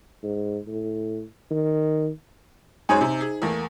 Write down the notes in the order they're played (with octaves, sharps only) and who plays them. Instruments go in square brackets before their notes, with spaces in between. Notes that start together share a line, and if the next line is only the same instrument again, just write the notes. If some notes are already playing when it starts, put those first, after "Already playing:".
[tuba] G#2
A2
D#3
[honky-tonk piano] F#2 G#3 C#5 [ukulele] D#4 C5 G#5
[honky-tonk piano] C3
G#4
E2 A3 A#3